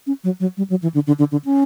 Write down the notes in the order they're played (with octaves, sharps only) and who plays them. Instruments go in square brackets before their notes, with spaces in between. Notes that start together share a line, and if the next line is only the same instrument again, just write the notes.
[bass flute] C#4
F#3
F#3
G3
F#3
E3
D3
D3
D3
D3
C#4